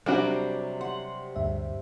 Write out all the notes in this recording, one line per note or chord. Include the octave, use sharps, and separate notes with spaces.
C3 F#3 G3 D4 F#4 D6
F#5 C6
D2 G2 E5